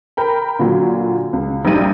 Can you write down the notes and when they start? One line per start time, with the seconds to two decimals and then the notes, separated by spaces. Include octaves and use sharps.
0.17 A#4 G5 A#5 B5
0.59 A#2 D3 F#3 F4
1.33 C#2
1.65 A#1 G2 G3 D#4 G5 D#7